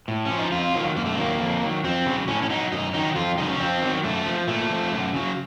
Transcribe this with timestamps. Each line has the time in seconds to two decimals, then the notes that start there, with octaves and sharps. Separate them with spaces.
0.08 A2
0.25 C#4
0.31 F3
0.39 D#4
0.52 F2 F4
0.74 D#3 F#3
0.96 F#2 A#3
1.06 A3
1.15 D#3 F#3 A#3
1.40 F2
1.62 D#3 F#3
1.84 F2 C4
2.06 C#3 F#3
2.28 A2 C#4
2.43 C#4
2.50 F#3 D#4
2.72 F#2 D#4
2.94 D#3 F#3 D#4
3.16 F2 F4
3.38 C#3 F#3 D#4
3.50 C#4
3.60 F2 C4
3.81 D#3 F#3
4.03 F#2 A3
4.26 F3
4.47 A#2 A3
4.70 F3
4.92 F#2
5.13 C#3 F#3